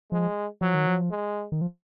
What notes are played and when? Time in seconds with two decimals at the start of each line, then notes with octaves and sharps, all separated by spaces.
0.11 F3 G#3
0.61 F3 F#3
0.74 D#3
0.87 F3
1.11 G#3
1.52 D#3
1.61 F3